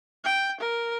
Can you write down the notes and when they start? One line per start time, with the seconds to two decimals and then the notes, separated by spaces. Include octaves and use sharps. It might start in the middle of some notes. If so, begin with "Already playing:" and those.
0.25 G5
0.60 A#4